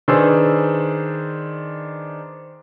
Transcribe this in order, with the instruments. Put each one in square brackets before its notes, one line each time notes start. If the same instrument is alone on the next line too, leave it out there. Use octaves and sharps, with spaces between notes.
[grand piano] D#3 D4 G#4 B4 C5 E6